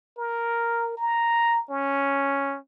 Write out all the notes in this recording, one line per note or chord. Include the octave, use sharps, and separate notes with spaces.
A#4
A#5
C#4